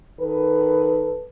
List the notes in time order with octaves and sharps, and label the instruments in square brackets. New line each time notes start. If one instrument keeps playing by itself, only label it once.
[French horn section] D#3 A4 B4